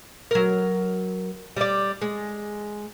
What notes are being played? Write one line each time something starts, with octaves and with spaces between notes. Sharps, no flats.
F#3 A#4
G3 D5
G#3